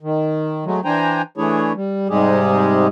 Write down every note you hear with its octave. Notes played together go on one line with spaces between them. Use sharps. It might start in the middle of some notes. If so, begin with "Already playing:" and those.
D#3
F#3 G#3 A3
E3 D4 C5 G5 G#5 A#5
E3 A3 D4 E4 G#4 C#5
G3
G#2 C3 G3 G#3 G4 G#4